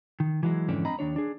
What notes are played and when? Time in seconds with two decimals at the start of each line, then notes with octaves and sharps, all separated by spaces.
0.20 D#3
0.43 E3 F#3 G#3
0.69 F2 G#2 D3 E3 C#4 D4
0.85 C4 D4 D#5 A#5 B5
0.99 D#2 D4 C#5
1.16 D4 G#4